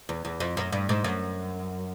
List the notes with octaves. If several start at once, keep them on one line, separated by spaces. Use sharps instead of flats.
E2
E2
F2
F#2
G2
G#2
F#2